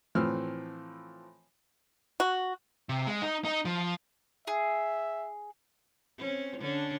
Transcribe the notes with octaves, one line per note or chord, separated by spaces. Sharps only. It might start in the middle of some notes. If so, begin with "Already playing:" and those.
A2 E3 F3 C4 E6 F6
F#4
C3
G#3
D#4
D#4
F3
G#4 E5
C4 C#4
D3 C#4 D4